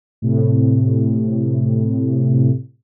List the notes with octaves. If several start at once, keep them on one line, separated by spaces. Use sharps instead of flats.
A2 C3